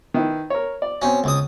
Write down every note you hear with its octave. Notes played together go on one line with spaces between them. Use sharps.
D#3 E4 B4
A#4 C#5
D5
B2 C4 C#4
C#2 D#6